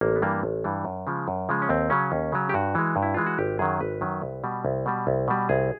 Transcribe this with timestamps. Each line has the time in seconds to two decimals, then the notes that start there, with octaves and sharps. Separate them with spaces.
0.01 A1 A#3
0.16 B3
0.22 G2 E3 G3 A#3
0.43 A1
0.64 G2 E3 G3
0.85 F#2
1.07 C#3 F3 G#3
1.28 F#2
1.49 C#3 F3 G#3
1.62 C#4
1.69 D#2 C4
1.90 C#3 F#3 C#4
2.12 D#2
2.32 C#3 F#3
2.49 G4
2.54 G2 F#4
2.75 E3 G#3
2.96 G2
3.03 E4
3.14 E3 G#3 F4
3.26 F#4
3.38 G#1 G4
3.59 F#2 D#3 F#3 G#4
3.81 G#1 B4
4.01 F#2 D#3 F#3
4.22 C2
4.44 B2 G3
4.65 C2
4.86 B2 G3
5.07 C2
5.28 B2 G3
5.49 C2 G#4